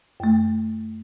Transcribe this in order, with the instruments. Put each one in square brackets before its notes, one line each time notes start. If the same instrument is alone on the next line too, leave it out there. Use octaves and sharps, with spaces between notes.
[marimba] F#2 A3